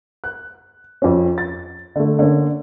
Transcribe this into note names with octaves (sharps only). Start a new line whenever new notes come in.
F#6
F2 C#4
A6
D3 A3
D3 A#3 C#4